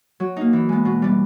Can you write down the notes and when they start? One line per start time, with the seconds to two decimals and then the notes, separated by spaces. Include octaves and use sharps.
0.20 F#3
0.37 A#3 D#4
0.53 E3
0.69 G#3 B3
0.85 B2
1.02 G3 B3